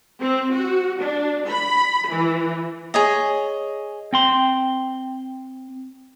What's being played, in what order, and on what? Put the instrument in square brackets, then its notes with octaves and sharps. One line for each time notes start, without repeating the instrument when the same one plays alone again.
[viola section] C4
F#4
D4
B5
E3
[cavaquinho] G#4 C#5 D#5
[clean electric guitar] C4 G5 C6